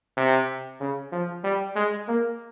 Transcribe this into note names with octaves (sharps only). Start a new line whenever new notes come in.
C3
C#3
F3
G3
G#3
A#3